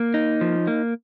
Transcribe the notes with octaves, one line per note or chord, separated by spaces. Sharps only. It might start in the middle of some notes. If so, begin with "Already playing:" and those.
Already playing: A#3
D#4
F3
A#3